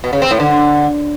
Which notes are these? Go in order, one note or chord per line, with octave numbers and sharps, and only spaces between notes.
B2
C#3
C4
A2
D3